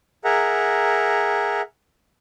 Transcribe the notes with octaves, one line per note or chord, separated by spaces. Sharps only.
G#4 A#4 E5 F#5 A#5